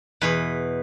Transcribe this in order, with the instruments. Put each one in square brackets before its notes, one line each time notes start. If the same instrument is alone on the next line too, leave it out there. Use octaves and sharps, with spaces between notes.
[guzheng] E2 B2 B4